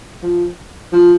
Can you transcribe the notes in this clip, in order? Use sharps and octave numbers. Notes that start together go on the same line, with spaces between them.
F3
F3